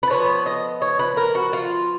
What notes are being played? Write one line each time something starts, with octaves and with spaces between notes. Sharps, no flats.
B4
F3 B3 C#5
D#5
C#5
B4
A#4
F#4
F4